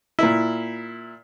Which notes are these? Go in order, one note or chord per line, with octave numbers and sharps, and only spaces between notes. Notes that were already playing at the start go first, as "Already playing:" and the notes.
A#2 E4